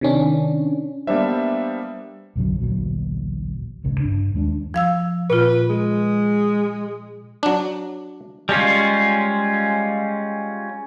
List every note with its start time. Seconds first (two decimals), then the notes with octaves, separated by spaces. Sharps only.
0.01 C3 D#3 C#4 D4
1.07 G3 A#3 B3 D4 C5 E5
2.36 B1 F#2 D3 F#3
2.59 A1 D2 A#2 F#3
3.84 G#1 C#2 C#3
4.00 G2 D4
4.34 D#2 G#3 C4 D4
4.74 F3 F5 E6
5.30 A#2 F4 B4
5.70 G#3
7.43 F#3 D4
8.49 G3 G#3 C#4 F4